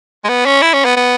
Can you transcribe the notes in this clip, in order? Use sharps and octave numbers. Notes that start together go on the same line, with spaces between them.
G#3
B3
C#4
E4
C#4
B3
B3